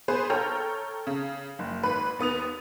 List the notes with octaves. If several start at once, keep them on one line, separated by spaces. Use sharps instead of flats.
B3 G#4 B4 C5
A4 C#5 G5 A#5 F6 G6
C#3
F#1
G#1 B4 B5
D#2 B3 D#6 F7